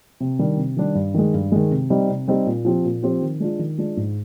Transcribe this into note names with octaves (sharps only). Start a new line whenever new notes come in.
C3
D#3 G3 D4
C3
D#3 G3 D4
G2
D#3 G#3
G2
D#3 G#3
C3
G3 C4 D#4 G4
C3
G3 C4 D#4 G4
A#2
F3 C4 G4 C5
A#2
F3 C4 G4 C5
D#3
G#3 D4 F4
D#3
G#3 D4 F4
G#2